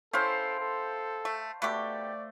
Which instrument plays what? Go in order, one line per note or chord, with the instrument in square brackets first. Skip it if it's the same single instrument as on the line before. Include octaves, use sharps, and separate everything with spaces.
[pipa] C#4 E4 [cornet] A4 [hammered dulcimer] C5 F5 G5
[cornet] A4
[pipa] A3
[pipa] B2 D3 G4 [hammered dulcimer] A3 [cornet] D5